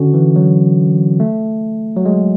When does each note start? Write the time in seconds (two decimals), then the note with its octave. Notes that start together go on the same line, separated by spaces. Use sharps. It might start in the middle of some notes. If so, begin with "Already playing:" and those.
Already playing: D3 C#4 F#4
0.14 E3
0.36 F#3
1.20 A3
1.96 F#3
2.06 G#3